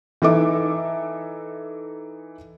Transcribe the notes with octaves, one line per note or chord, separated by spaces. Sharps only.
E3 D#4 A4 E5 D6